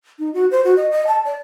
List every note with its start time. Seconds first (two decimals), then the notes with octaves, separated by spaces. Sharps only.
0.19 D#4
0.34 F#4
0.51 C5
0.64 F#4
0.77 D#5
0.91 D#5
1.07 A5
1.25 D5